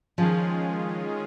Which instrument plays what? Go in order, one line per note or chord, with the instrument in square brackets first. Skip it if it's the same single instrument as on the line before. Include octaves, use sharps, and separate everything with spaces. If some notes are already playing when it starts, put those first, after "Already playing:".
[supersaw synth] D#3 G#3 C#4 F4 G#4 [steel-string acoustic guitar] F3